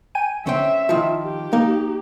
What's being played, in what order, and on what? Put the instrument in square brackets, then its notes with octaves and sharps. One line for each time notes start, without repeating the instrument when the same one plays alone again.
[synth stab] G5 G#5 D#7
[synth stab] D3 [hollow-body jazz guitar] C#4 C5 G5 [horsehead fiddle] E5
[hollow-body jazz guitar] D#3 F3 [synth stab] E4 F4
[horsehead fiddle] G4
[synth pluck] A#3 [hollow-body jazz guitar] D#4